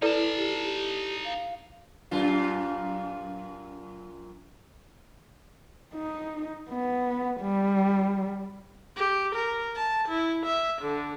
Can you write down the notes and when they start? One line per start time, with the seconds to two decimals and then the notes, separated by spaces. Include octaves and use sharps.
0.02 D#4 E4 A4 B4 D5 A5 B5
0.37 G4
0.63 G4
1.25 F5
2.11 F#2 A#2 F4
5.94 D#4
6.69 B3
7.41 G3
8.96 G4
9.35 A#4
9.76 A5
10.08 E4
10.45 E5
10.82 D3